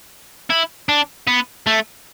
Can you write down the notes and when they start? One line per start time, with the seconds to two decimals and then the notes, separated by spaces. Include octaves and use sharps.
0.50 E4
0.89 D4
1.27 B3
1.67 A3